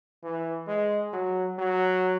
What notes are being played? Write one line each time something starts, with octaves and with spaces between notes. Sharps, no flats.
E3
G#3
F#3
F#3